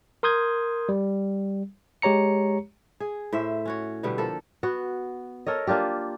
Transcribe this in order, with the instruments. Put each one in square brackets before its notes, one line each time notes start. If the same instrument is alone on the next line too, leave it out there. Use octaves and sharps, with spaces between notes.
[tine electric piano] A#4 C6 D#6 G6 G#6
G3
G#3 G4 C#5 A#5 C#7
[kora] G#4
A2 C5 E5
C#4 F#4 C#5
B2 D3 G3 B3
F3 A#3 A4
B3 F#4
A4 A#4 C#5 D#5
A#3 D4 F4 G4